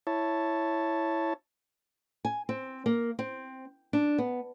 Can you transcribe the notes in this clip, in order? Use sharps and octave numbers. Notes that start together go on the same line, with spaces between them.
E4 C#5 A5
G#5
C4
A#3
C4
D4
B3